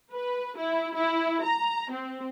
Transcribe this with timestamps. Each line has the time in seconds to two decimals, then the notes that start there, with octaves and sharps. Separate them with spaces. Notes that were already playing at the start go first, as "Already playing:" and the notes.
0.13 B4
0.58 E4
0.95 E4
1.44 A#5
1.91 C4